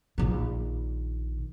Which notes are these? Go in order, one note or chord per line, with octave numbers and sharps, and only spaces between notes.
A#1 D#3